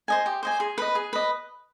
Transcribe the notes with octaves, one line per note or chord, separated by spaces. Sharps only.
C5 D#5 G#5
G4
C5 D#5 G#5
G#4
B4 D#5
G#4
B4 D#5